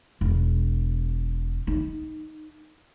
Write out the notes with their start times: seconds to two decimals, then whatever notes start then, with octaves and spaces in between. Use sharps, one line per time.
0.21 E1
1.67 D#4